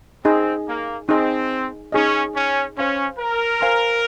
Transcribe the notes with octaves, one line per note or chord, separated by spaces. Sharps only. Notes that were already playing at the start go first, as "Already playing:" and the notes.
C4 D#4 G#4 D#5
A#3
C4 D#4 G#4 D#5
C#4 D#4 G#4 D#5
C#4
C#4 C5 F5 G#5 C6
A#4
C5 F5 G#5 C6